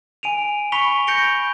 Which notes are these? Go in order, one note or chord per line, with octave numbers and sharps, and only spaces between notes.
G#5 D7 D#7 F7
B5 C#6 B6 C#7 F7 G7
G6 A#6 C#7 D7 F7 G7